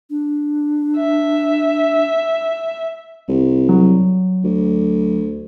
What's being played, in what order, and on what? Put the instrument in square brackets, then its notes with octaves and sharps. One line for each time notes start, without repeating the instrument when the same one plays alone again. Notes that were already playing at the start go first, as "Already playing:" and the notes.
[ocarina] D4
[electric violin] E5
[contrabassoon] C2
[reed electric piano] F#3
[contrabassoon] D2